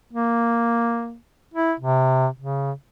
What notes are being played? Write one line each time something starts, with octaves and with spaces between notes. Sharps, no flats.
A#3
E4
C3
C#3